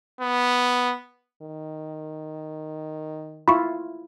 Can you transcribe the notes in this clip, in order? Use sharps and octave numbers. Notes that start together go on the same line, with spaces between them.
B3
D#3
E4 F4 B5 C#6